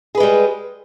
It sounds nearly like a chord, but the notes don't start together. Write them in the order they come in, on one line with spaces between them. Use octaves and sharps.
G#4 B4 G#3 G3